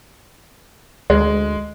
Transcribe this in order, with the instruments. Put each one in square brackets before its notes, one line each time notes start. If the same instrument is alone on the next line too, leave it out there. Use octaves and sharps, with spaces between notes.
[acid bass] D2 [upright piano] G#3